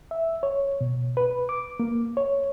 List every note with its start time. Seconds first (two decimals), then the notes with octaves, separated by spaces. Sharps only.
0.11 E5
0.43 C#5
0.81 B2
1.17 B4
1.49 D6
1.80 A#3
2.17 C#5